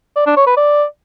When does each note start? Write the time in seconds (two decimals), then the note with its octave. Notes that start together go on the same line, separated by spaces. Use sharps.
0.16 D5
0.26 D4
0.36 C#5
0.47 B4
0.57 D5